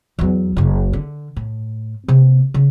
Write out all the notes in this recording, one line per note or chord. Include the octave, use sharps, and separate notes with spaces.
E2 F#3
F#1 C#3
D3
A2
C3 A#3
C#3